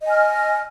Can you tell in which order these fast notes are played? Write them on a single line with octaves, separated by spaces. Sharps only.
D#5 G#5 F6